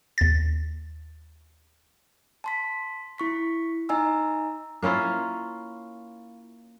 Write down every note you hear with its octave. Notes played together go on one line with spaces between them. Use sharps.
D#2 A6
A5 C6 B6
E4 C#6 B6
D#4 D#5 G#5 A#5 E6
A#3 C#4 E4 F4